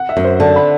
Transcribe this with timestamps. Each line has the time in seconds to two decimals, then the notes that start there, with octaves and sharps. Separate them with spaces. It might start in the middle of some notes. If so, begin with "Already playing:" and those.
Already playing: F#5
0.09 E5
0.17 F#2
0.24 C5
0.40 D3 A5
0.56 B5